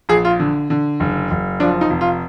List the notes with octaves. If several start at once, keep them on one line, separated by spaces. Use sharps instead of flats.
A#1 G#4
F4
D3
D3
F#1
F#1
F3 D4
D#4
F1
F4